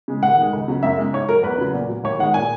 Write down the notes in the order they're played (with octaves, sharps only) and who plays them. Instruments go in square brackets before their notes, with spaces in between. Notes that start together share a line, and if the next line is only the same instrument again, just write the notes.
[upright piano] C#3 G#3
D#2 F#5
D#3 G#3
C#2
C#3 F#3
F#2 E5
C#3 G#3
G#2 C#5
F#3 A#4
E2 B4
C#3 F#3
A#2
F#3
D#2 C#5
D#3 G#3 F#5
A#2 G#5